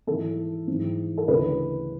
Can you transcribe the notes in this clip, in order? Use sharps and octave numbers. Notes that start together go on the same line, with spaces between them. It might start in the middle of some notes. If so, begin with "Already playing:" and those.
G#2 E3 A4
G#2 E3
A4
D2 C#3 E3 B4